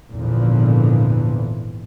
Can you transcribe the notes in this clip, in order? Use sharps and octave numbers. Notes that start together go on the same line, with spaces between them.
G#1 E2 A#2 D3 E3 F3